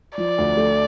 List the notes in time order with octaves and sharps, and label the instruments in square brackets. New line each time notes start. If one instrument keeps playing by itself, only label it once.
[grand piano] F3 [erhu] D5
[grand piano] D2
A3